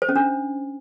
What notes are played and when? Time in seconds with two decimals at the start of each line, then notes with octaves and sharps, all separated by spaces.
0.02 C5
0.09 C#4
0.16 D4